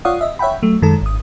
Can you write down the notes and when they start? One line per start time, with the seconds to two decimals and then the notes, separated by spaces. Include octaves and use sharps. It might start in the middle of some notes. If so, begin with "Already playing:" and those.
0.05 F4 C#5 D5 F5 F#5 D#6
0.21 D#5 E5
0.39 C#5 E5 F#5 G5 B5
0.63 F#3 A3
0.82 F#2 D#3 G#3 A4
1.01 G#1 D#6